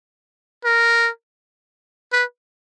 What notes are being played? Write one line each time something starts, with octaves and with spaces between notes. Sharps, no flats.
A#4
B4